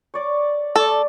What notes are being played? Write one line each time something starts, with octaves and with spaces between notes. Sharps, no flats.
C#5 D5 D6
A3 A4 D5